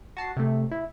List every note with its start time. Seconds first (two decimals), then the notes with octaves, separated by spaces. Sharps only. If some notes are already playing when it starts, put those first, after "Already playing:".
0.17 F#4 A5 C7
0.37 C3 A3
0.71 E4